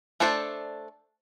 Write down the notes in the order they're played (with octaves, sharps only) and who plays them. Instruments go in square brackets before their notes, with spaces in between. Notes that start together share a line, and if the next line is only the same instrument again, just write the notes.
[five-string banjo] A3 D4 A4 C5 D5